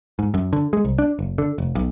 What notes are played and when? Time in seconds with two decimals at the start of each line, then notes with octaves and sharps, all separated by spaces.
0.19 G#2
0.34 F#2
0.53 D3
0.73 G#3
0.85 C2
0.99 D4
1.19 F#1
1.38 D3
1.58 F1
1.75 B1